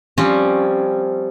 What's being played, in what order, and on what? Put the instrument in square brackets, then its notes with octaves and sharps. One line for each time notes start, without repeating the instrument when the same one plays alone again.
[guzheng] F3 G3 C4 C#4